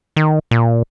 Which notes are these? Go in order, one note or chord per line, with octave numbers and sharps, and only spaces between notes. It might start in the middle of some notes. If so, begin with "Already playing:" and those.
D#3
A#2